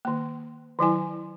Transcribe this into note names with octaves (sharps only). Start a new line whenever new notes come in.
D#3 A#3
D#3 F#3 E4 G#5